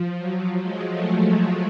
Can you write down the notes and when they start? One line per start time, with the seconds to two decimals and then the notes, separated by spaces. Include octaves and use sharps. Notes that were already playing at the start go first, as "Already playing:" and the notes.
Already playing: F3
0.19 F#3
0.62 G#3
0.91 A3
1.20 A3